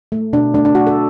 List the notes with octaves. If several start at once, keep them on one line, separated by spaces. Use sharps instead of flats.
A3
B2 D4
A3 D4
D4
A3 F#4
A4